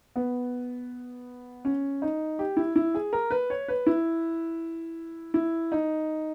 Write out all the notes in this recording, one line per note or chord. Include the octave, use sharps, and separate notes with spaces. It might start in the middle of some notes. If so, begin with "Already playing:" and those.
B3
C#4
D#4
G4
E4
E4
G#4
A#4
B4
C#5
B4
E4
E4
D#4